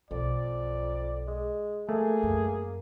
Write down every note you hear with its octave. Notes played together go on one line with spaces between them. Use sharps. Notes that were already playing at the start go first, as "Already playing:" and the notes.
B1 F2 D5
G#3
A3 A#3 G#4
F#2